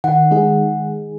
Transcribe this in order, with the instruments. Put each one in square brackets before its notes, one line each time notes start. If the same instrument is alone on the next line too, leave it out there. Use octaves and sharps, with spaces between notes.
[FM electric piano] D#3 [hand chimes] F#5
[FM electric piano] G#3 D#4 G#4